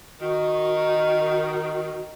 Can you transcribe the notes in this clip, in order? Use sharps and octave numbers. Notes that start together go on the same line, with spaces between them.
D#3 D#4 F#4